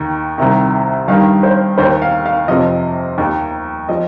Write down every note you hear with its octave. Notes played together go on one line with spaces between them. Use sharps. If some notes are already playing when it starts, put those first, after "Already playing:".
Already playing: D#2 D#3
C2 C3 D#3
G2 D#3 F5
C5
D#2 D#3 C5
F5
F5
F2 C3 F3 D#5
D#2 D#3
F3 D#5